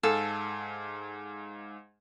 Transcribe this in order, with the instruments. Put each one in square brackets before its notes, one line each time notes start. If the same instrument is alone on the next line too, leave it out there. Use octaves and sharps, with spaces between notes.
[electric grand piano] G#2 F5 G#5 [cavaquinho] A4